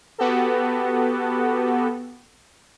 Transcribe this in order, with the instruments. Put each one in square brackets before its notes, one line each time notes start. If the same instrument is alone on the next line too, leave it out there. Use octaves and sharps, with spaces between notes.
[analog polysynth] B3 F#4 G4 A4